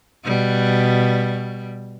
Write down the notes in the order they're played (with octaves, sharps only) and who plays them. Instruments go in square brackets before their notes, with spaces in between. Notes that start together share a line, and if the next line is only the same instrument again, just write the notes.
[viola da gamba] B2 G3